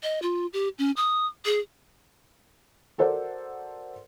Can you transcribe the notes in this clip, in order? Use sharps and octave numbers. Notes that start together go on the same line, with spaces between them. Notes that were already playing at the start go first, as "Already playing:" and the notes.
D#5
F4
G4
C#4
D#6
G#4
F#4 A4 A#4 C5 D5 F#5